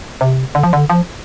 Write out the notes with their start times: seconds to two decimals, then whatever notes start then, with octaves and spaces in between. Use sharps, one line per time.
0.21 C3
0.55 D3
0.63 F3
0.73 D3
0.90 F3